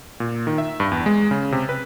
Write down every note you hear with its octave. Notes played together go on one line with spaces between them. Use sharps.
A#2
D#3
E5
G2
E2
G#3
C#3
C3
B4